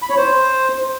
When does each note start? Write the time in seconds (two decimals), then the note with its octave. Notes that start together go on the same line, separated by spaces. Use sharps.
0.02 B5
0.10 C#5
0.17 C5